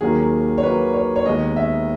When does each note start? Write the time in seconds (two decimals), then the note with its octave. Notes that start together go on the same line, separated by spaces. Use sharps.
0.01 D#2 D#3 F#3 A#3 G#4
0.58 C#5
0.63 D#2 D#3 F#3 A#3 B4
0.94 C#5
1.16 C#5
1.26 D#2 D#3 G#3 B3 D#5
1.56 E5